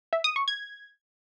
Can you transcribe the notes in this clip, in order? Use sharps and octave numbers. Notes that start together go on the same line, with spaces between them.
E5
D#6
C#6
G#6